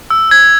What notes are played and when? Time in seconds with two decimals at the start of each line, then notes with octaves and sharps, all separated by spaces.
0.10 E6
0.31 G#6